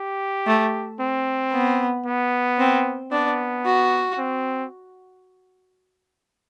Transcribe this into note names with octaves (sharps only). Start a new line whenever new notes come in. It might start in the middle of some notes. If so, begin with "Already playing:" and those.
Already playing: G4
A3
C4
B3
B3
C4
B3 D4
F#4
C4